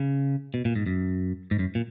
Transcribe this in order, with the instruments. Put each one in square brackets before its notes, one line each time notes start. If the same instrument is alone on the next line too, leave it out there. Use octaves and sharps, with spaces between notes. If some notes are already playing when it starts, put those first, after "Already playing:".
Already playing: [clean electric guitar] C#3
B2
A#2
G#2
F#2
G#2
F#2
A#2